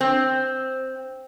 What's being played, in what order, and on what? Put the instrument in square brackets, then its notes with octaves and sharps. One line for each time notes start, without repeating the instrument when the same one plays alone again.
[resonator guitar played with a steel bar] C4